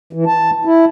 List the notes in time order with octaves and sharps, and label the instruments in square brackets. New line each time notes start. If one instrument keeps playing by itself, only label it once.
[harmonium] E3
A5
E4